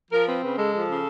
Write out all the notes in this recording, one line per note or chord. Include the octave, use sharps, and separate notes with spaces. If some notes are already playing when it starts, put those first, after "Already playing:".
F3 A#4
C4 B4
C#3 B4
G#3 A4
F3 A4
C#3